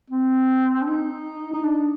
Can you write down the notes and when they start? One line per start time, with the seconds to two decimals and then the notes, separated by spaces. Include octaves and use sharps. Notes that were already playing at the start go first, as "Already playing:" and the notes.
0.10 C4
0.82 D4
0.87 D#4
1.54 D#4
1.64 D4